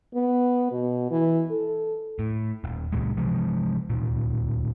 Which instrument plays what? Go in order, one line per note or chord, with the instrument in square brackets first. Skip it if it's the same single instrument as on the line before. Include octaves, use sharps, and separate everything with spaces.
[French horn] B3
B2
E3
A4
[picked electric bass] A2
D#1
C#2 A#2 G#3
C3 F3 G#3
D1 A#2